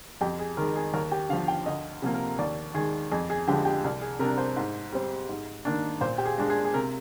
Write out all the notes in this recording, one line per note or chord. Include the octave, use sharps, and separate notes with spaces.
F2 G4
G#4
D#3 G#3 A#4
G#4
D#2 A#4
G4
D3 F3 F5
G5
D2 D#5
C3 F3 A#3
A#4
D#2 D5
D#3 G#3 G#4
F2 G#4
G#4
D3 F3 G#3 G4
G4
C2
G#4
C3 G3 D4 A#4
C5
G#2
G3 C4
G#2
D#3 A#3 D4
A#2 C5
G4
G#4
G#3 D4
G#4
G#4
C3 A#4